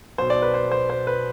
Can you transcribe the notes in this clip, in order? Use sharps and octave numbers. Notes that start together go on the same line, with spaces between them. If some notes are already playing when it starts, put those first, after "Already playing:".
B1 B2 C5
D5
B4
C5
C5
C5
B4